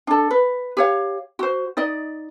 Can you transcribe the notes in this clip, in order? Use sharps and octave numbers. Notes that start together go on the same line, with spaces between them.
D4 A4
B4
G4 C#5 F5
F#4 C5
D#4 D5 D#5